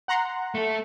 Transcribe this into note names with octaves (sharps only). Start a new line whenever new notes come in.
F#5 A#5 C6
A3 A4